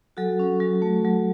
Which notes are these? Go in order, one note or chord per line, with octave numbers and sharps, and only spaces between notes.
F#3 F#4 A4
C#4
F#3
A3
F#3